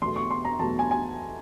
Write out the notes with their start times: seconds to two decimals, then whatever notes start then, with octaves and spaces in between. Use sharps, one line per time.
0.02 E2 B2 F#3 A3 C6
0.16 C#6
0.31 C6
0.45 A#5
0.59 E2 B2 F#3 A3 A5
0.79 G#5
0.91 G#5